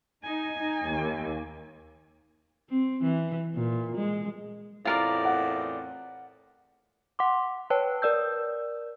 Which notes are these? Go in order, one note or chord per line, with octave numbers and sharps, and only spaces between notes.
D#4 G#5
D#4
D#2
C4
E3
A#2
G#3
E2 A2 C4 F4 A#4 D5
F#5
F#5 C6 D6
B4 C#5 G5 A5
A#4 D5 E6 G6